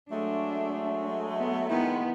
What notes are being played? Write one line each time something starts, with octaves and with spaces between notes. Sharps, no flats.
F#3 G#3 A3 D4
B3
D#3 G#3 B3 E4